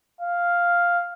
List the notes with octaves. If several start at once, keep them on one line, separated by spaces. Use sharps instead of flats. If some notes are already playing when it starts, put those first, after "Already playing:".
F5